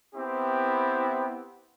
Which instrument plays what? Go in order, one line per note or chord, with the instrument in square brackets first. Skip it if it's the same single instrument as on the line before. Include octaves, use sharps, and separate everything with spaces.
[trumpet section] B3 C4 E4 G4